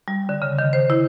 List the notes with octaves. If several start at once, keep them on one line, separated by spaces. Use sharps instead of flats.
G3
D3
C#3
D#3
C5
E4